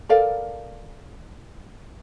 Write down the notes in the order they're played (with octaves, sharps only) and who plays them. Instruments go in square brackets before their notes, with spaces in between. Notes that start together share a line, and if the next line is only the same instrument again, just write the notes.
[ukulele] A4 A#4 D5 F5